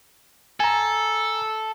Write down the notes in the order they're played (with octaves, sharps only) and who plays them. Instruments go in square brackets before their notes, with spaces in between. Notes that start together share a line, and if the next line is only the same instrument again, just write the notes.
[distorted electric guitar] A4 [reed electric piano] G#5 A#5